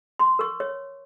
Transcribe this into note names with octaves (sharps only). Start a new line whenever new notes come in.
C6
A#4 C#6
C#5